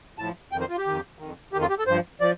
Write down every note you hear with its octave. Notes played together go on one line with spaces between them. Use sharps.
A2 F3 A5
F2 D#3 G5
C5
F4
G4
F2 D#3
F2 D#3
F2 D#3 G4
F4
G4
A4
G2 F3 C5
F3 D5